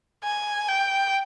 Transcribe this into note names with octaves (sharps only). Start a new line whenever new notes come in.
G#5
G5